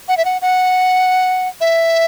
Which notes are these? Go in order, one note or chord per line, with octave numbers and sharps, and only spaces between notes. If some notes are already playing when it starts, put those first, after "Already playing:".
F#5
E5
F#5
F#5
E5